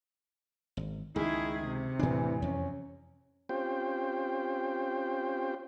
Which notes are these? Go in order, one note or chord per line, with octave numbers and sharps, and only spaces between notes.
G#1
C#2 D#3 G#3 E4 G#4
C3
E2 A2 E3 D4
F2 C#4
C4 C#4 F4 G4 C5 G5